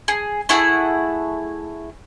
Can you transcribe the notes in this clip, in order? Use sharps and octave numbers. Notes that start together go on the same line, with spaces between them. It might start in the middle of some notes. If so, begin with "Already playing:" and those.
G#4
A3 E4 G#4 F#5